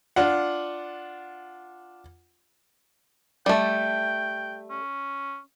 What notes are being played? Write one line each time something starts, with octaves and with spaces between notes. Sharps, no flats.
D4 F4 F#5
G3 A3 G5
C#4